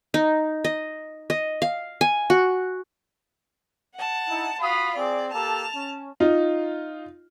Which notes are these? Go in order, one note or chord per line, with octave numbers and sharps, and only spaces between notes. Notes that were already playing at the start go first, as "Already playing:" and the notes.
D#4
D#5
D#5
F5
G#5
F#4
F#5 A5
D#4 E4
F4 F#4 F5 B5 D#6
C4 G#4 D5
A#3 G4 A4 A5 F7
C#4
D#4 F4